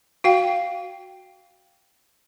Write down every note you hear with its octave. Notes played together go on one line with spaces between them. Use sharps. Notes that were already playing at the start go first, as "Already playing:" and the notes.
F#4 F5 G5